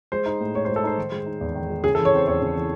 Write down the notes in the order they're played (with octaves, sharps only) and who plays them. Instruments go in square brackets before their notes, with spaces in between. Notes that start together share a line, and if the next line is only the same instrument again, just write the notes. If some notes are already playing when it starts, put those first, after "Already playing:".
[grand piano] G#3 C5
D#4
A2
A2 C#5
C5
G#3
A4
D#4 C5
D#3
G#3
D#4
E2
D#3
G#3
C#3 G#4
A4
E3
C#5
C4 C5
E2 C#5
C#3
E3